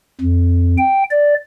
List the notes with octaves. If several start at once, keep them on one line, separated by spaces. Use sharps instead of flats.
F2
G5
D5